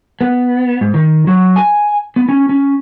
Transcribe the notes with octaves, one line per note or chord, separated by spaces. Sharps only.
B3
G#2
D#3
F#3
G#5
B3
C#4
C#4